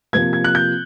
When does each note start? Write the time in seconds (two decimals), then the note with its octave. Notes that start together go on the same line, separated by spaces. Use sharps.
0.13 C3 F3 A#3 G#6
0.33 G#6
0.44 F#6
0.55 G6